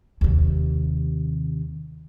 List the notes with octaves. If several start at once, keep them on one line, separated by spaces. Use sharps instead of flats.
D#2 C3